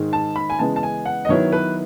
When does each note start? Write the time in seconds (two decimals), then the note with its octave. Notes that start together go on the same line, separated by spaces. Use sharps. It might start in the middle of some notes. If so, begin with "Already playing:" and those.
Already playing: G#2 D#3 G#3
0.13 A5
0.36 B5
0.50 G#5
0.59 C#3 E3 G#3 B3 A5
0.76 A5
0.83 G#5
1.06 F#5
1.25 D#5
1.29 D#3 F#3 B3 E4 C#5
1.52 B4